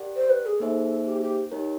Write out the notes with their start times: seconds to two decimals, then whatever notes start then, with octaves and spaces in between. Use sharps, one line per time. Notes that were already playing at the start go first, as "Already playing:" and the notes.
Already playing: G4 A#4 D5 F#5
0.16 C5
0.30 B4
0.46 G#4
0.60 A#3 D#4 G#4 A4 C5 E5
1.06 G4
1.21 G4
1.51 D#4 G4 A#4 C#5